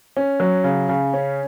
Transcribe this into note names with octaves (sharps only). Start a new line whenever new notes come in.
C#4
F#3
C#3
C#3
C#4